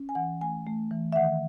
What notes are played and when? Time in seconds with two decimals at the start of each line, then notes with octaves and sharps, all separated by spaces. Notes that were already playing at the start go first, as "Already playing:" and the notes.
Already playing: C#4
0.09 G#5
0.15 E3 F#5
0.41 A3 G#5
0.66 A3
0.91 E3
1.13 E5
1.16 D#3 F#5